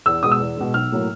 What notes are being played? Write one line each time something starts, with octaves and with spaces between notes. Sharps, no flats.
E2 E6
B2 G#3 D#6
E6
E2
B2 G#3
B1 F6
A2 F#3 A#3